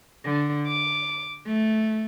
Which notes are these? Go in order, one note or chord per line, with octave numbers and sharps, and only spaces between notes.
D3
D6
A3